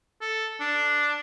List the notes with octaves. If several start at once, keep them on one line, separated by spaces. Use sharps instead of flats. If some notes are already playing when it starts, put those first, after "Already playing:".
A4
D4